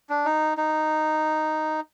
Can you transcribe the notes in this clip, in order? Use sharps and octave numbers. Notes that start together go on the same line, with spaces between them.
D4
D#4
D#4